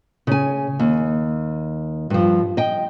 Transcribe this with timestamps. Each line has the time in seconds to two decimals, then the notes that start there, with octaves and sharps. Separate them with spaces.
0.27 C#3 G#5
0.79 D#2
2.10 G2 F3
2.57 D#5 G5